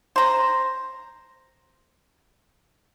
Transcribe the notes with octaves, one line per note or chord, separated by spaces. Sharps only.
C5 A#5